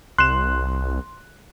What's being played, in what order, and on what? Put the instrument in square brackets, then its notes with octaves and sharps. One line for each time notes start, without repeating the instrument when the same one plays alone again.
[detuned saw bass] C2 [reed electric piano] C6 [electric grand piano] F#6 E7